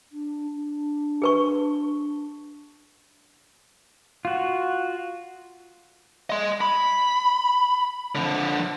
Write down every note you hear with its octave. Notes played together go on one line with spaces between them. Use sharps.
D4
D4
G#4 B4 C#6
F4 F#4
D#5 C6
B5
D3 F3